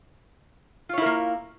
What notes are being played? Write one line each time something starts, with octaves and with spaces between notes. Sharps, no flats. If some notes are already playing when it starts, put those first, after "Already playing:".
A#3 E4 F4 A#4 C#5